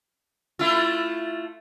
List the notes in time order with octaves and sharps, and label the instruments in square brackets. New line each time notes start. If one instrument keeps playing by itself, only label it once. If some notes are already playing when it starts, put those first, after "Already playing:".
[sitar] A3 E4 F4